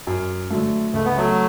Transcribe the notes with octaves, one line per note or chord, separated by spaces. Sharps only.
F#2
D3 F#3 A3
C#2 A3
B3
F#3 A3